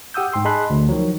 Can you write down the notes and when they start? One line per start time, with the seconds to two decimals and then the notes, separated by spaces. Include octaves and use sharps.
0.14 G4 F#5 D#6 E6 G6
0.32 G#2 G5 C6 E6
0.45 G#4 D#5 A5 B5 C6 F#6
0.70 D2
0.89 D#3 F3 F#3